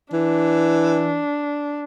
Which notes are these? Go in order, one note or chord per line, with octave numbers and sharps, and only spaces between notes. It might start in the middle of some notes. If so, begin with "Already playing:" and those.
E3 D4